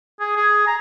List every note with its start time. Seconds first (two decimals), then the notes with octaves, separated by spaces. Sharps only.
0.20 G#4
0.36 G#4
0.67 A#5